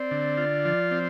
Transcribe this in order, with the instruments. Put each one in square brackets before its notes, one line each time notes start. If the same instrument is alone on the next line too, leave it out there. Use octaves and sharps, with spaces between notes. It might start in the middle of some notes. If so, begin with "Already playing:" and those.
Already playing: [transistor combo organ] C4 [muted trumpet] D5
[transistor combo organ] D3
F4
F3
C4